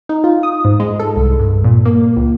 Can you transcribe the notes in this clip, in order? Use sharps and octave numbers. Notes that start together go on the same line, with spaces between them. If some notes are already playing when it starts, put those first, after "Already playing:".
D#4
F4
D#6
G#2
G#3
A4
C2
G2
A#2
A#3
C#2